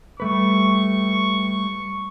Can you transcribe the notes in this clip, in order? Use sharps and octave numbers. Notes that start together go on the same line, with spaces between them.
G3 A3 B4 C#6